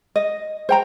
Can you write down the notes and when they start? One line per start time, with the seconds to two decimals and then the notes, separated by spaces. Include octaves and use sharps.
0.16 D#5
0.69 C5 G5 A#5